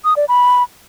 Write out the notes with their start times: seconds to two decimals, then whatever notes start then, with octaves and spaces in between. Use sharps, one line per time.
0.05 D#6
0.17 D5
0.28 B5